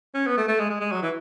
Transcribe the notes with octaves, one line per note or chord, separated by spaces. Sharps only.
C#4
B3
A3
A3
G#3
G#3
G#3
F#3
E3